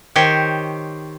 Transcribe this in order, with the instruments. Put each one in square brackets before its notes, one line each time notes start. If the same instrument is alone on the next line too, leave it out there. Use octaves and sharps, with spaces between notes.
[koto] D#3 G4 C5 C#5